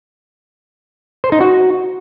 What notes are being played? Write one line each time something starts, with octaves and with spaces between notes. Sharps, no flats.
C5
D#4
F#4